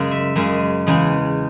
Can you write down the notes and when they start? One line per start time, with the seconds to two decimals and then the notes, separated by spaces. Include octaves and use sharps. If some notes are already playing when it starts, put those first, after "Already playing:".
Already playing: F#2 C#3 G#3
0.11 E5
0.36 F#2 C#3 G#3
0.87 E2 C#3 G#3